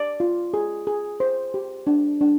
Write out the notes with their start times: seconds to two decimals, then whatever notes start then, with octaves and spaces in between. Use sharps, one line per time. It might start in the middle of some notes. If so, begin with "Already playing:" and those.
Already playing: D5
0.20 F4
0.54 G#4
0.87 G#4
1.20 C5
1.54 G4
1.87 D4
2.21 D4